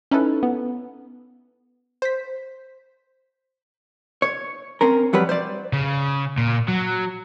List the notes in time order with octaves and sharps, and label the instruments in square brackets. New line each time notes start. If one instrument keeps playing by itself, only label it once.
[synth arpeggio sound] C#4 D#4 E4 A4 B4
B3
C5 B6
[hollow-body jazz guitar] C#5
C4 C#4 A#4
F2 F#3 G3 B4
C5 D5
[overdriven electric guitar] C#3
A#2
F#3